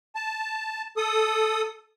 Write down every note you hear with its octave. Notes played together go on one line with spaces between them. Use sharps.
A5
A4 D#6